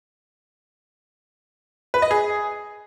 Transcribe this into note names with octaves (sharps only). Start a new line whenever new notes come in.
B4
D#5
G#4